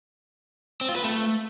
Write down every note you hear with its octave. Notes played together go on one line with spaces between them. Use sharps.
C4
F4
B4
A3